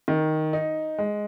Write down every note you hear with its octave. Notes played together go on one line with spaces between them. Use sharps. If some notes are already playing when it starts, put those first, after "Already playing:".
D#3
D#4
G#3